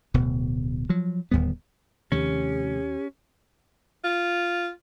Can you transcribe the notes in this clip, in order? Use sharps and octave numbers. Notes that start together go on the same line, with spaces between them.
D1 D2 B2
F3 F#3
D1 D#2 G3 B3
D#2 C3 D#3 F3 A3 C#4 G4
F4